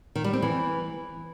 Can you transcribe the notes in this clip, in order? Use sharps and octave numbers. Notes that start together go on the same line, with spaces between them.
D#3
G3
C4
E3